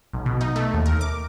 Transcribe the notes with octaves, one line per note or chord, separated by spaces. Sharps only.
B1
B2
D#4
A3
D#2
A#4
D6